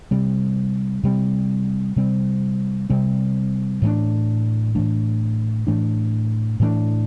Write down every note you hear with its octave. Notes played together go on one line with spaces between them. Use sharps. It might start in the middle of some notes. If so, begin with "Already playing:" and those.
C3 G3 C4
C3 G3 C4
C3 G3 C4
C3 G3 C4
A2 E3 A3 D4
A2 E3 A3 D4
A2 E3 A3 D4
A2 E3 A3 D4